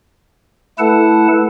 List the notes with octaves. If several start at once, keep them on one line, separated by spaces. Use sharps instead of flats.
A3 E4 A4 B4 F#5 A5